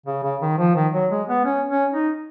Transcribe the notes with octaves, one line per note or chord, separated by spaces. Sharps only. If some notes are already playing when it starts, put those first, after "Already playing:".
C#3
C#3
D#3
F3
D#3
F#3
G#3
B3
C#4
C#4
D#4